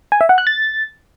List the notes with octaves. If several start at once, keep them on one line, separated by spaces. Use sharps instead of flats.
G#5
E5
F#5
F#6
A6